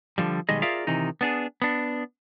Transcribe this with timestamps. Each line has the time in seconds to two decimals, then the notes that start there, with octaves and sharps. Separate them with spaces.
0.18 D3 F3 G3
0.49 B1 D#3 G3 G#3 D#5
0.62 F4 G#4 A#4 D5 E5 F5
0.87 C3 D#3 E3 D#4
1.21 B3 D4 G#4
1.62 B3 D4